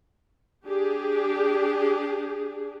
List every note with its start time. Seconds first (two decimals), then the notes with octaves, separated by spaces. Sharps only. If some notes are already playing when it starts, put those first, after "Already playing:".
0.66 D4 G4 G#4